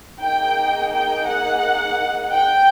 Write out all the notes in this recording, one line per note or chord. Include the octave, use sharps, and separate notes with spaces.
A#3 D#4 G#4 G5
G5
F#5
G5